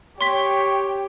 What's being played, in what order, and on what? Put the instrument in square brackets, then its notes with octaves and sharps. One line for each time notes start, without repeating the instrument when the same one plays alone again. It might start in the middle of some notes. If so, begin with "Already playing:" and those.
[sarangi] G4 [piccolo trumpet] C#5 [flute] G5 [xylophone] C6 B6